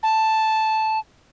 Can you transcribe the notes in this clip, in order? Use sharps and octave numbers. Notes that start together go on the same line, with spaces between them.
A5